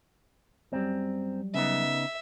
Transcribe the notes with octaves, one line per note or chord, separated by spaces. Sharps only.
F#2 F#3 G3 C4
C#3 B3 D#4 E5